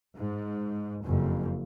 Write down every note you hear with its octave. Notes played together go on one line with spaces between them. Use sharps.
G#2
F#1 F2